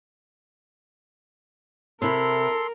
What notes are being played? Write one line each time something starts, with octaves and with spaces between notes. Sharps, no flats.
C3 E4 A4 A#4 C6